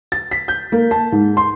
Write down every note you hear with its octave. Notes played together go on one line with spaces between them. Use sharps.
A6
B6
G6
A#3
A5
G#2
C6